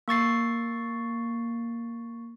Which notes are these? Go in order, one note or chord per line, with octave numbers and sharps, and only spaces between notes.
A#3 C#6 A6 C7